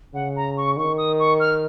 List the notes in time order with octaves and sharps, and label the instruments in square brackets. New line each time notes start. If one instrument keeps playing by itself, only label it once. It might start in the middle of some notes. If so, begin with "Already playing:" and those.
[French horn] C#3 [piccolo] F#5
[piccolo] A#5
C#6
[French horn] D#3 [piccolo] C#6
[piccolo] D#6
C#6
F6